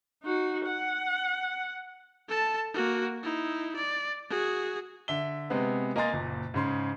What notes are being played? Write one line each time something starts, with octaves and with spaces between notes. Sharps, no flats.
D#4 F#4
F#5
A4 A5
A#3 F#4
D#4 E4
D5
F#4 G#4
D3 E5 G7
C3 G#3 B3
A#3 D#5 G#5 A#5 C6 A6
F#1 A#2
G#2 C#3 C6